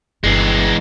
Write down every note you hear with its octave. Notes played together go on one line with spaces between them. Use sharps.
G1 E3 G#3